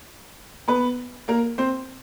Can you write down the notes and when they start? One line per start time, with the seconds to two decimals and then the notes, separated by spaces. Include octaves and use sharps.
0.68 B3 B4
1.28 A#3 A#4
1.58 C4 C5